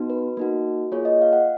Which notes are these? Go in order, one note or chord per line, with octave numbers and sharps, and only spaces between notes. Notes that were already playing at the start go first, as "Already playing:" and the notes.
Already playing: B3 D#4 F#4
B4
A#3 D#4 F#4
A#3 F4 G#4 C#5
D#5
F5
F#5